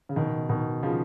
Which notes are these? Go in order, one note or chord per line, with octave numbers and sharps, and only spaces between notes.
C#3
B2 D#3
B2 D#3
C#3 F3